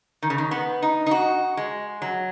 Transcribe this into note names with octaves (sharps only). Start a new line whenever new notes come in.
D#3
C#3
D#3
B3
D#4
D#4
F#4
G#3
F#3